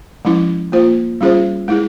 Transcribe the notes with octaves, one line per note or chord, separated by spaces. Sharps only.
F3 G#3 C#4 E4
A#3 F4 C5
G3 C#4 F4 G#4 C5
G#3 E4 G#4